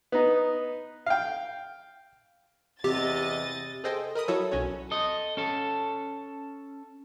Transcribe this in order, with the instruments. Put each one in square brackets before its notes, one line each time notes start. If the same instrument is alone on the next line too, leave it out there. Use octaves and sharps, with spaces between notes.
[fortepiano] B3 D#4
F5 G5
[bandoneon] E2 [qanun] C3 [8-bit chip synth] G4 [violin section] D#5 A6
[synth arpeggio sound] G#4 A4 C5 D#5 G5 G#5
A#4 D#5 B5 D#6
F#3 E4 F#4 A4 C#5
B1 C#4 F#4 C#5
[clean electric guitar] A4 D#5
C#4 A4